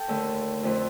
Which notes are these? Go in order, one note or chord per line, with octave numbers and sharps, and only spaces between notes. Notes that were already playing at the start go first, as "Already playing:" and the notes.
Already playing: A4 G5 A5
D#2 D3 A3
F2 D3 A3